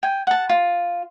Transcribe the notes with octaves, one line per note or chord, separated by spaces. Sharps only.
G5 G#5
F#5 A5
F4